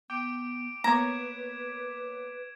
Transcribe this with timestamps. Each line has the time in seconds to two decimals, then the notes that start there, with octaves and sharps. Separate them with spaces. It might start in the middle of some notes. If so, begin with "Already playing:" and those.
0.10 B3 G5 D6 D7
0.84 A#3 B3 B4 C#5 A#5 D6 G#6 E7